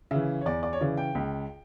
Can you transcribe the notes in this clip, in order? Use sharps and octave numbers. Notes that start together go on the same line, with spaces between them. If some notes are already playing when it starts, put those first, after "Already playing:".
C#3 E3 E5
C#5
E2 D5
D5
C#5
C#3 E3 D5
G5
C#2